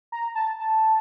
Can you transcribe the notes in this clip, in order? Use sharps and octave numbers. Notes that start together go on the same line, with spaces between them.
A#5
A5
A5